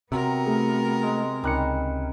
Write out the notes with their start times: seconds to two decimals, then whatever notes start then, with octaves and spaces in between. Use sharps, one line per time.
0.12 C3 F#3 B3 C4 F#4 A#4
0.46 A3 G#4
1.03 G#3 C6
1.43 C#2 D#3 G3 C#4 F#6 C#7